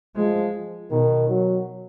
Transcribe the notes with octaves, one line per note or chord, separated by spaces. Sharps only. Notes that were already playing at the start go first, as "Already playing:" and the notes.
F3 G#3
B2 D#3
F#3